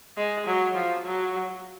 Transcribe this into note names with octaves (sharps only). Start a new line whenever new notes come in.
G#3
F#3
F3
F#3